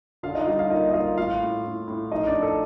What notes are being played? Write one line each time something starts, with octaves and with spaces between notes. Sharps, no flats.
D3 F4 F5
D#4 D#5
G3 F4 F5
F4 F5
A#3 D#4 D#5
D#5
A#3 F4 F5
A2 F4 F5
A2
A2
A2
F3 D#4 D#5
D4 D5
F3
A4